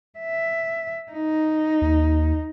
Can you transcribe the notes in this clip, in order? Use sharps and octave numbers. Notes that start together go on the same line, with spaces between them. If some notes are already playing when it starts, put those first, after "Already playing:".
E5
D#4
D#2